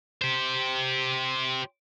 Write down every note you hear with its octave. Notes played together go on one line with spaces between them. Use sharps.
G4 C5